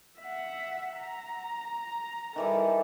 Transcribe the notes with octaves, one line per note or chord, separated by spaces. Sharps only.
E5 F#5
A#5
D#3 E3 G3 A4